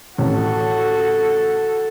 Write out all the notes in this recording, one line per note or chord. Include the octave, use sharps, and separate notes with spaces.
A1 F#4 A4